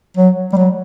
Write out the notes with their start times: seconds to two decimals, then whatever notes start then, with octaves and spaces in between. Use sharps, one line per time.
0.17 F#3
0.53 G3
0.57 F#3